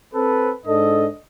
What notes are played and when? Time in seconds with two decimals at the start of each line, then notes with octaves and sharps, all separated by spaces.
0.14 C4 A4 B4
0.66 G#2 D4 A4 D#5